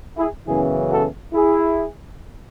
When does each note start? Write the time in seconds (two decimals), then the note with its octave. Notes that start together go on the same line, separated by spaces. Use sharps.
0.18 E4 G#4
0.47 F#2 C#3 E3 B3 E4 G#4
0.90 F#4 A4
1.34 E4 G#4